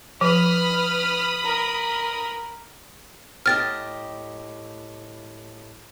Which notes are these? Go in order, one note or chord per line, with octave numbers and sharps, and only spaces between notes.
F3 B4 B5 D#6 F6
A#4
A2 G4 D#5 F6 A6